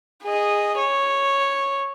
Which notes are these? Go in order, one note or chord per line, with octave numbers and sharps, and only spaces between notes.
G#4 D#5
C#5